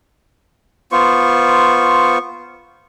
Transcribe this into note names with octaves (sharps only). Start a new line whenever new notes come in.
B3 F4 C5 C#6